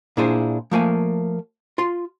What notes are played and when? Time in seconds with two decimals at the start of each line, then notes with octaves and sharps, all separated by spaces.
0.17 A#2 D4 E4 G#4 C5
0.71 F3 A3 A#3 G#5
1.78 F4 C6